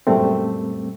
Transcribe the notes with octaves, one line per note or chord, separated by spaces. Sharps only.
F#2 A#2 G3 A3 C4